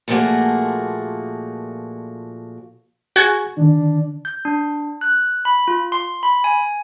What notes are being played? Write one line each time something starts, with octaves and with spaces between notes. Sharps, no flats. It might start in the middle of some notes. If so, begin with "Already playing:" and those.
A#2 F3 A3 A#3 F#4 G#4
F#4 G#4 G#5 G#6
D3 D#3 D4
G6
D4
F#6
B5
F4
C6
B5
G#5